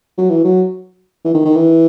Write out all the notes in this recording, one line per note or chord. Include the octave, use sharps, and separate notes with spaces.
F#3
E3
F#3
E3
D#3
D#3
E3